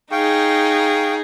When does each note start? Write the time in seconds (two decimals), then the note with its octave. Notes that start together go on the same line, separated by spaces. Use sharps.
0.12 D#4 G#4 F5 G5 C#6